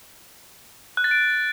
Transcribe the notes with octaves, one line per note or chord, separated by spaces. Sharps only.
F#6
A6
D7